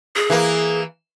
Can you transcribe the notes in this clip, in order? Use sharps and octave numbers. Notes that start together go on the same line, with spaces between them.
G#4
E3 A#3